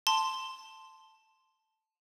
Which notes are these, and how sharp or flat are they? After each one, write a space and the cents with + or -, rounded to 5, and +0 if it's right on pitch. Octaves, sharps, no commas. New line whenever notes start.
A5 +0 C6 +0